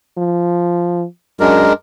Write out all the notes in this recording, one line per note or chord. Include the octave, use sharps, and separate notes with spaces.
F3
F#2 G#3 D4 A#4